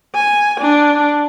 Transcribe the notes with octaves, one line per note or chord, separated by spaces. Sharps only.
G#5
D4